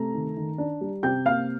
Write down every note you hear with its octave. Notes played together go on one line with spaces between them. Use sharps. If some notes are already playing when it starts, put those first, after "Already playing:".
Already playing: C3 A3 A#5
D#3
D#3
D4
G3
C3 G5 G6
A#3 F5 F6